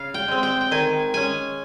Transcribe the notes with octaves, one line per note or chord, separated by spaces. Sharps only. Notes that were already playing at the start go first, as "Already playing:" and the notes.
Already playing: C#3 F5
G5
G#3 C4
G5
G5
D#3 G#5
G#3 C#4 G#5